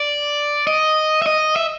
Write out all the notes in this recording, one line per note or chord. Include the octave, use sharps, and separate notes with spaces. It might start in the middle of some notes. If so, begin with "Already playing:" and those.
Already playing: D5
D#5
E5
D#5
E5